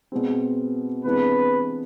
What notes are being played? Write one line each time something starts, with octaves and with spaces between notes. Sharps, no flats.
B2 G#3 C4
C3 E3 G#3 B3 D4 B4